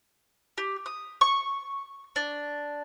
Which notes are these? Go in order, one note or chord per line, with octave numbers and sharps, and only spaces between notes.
G4
D#6
C#6
D4